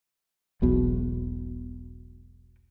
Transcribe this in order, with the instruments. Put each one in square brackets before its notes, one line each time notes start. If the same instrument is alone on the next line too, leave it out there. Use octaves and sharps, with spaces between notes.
[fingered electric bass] E1 B1 B2